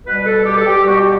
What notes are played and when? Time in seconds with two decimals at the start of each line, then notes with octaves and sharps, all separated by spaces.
0.06 B2 G3 B4
0.26 A4
0.46 G4
0.57 A4
0.66 G4
0.86 B2 G3 F#4
0.97 G4